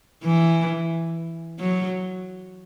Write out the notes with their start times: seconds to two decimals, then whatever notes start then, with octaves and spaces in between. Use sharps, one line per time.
0.25 E3
1.59 F#3